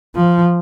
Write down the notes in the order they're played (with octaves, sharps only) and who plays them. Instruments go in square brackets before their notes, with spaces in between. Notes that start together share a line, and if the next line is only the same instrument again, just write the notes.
[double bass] F3